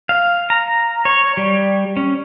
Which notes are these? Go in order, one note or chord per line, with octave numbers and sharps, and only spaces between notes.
F5
A#5
C#5
G3
C#4